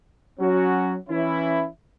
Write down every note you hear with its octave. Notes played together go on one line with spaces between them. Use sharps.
F#3 C#4 F#4
E3 C#4 E4